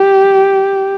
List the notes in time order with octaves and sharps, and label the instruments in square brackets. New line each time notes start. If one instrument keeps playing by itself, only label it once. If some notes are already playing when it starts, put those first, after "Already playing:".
Already playing: [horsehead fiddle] G4